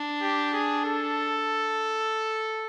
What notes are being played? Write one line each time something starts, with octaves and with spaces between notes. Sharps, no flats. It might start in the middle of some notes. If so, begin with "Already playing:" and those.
Already playing: D4
G4
G#4
A4